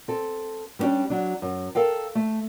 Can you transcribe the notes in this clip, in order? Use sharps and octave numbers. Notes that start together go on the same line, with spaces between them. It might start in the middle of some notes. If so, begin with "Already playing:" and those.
C4 A4
G3 B3 C#4 D4 G4
F#3 D4
F#2
A4 A#4 F5 G5
A3